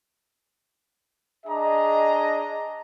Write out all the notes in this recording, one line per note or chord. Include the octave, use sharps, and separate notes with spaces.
D4 G#4 D#5 A#5